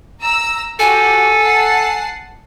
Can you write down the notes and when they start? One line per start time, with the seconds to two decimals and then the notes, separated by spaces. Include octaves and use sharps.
0.22 A#5 E6
0.79 F#4 G4 A4 G#5
1.41 F#5 A5 C7